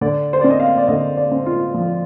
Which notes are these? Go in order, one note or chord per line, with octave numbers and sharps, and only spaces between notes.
D3 D5
C5
C4 D5
D#5
F5
D5
D3 D#5
D5
C4
F4
F3